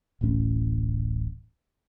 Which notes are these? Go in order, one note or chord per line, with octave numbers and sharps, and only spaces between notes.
D1 A1 A2 C#4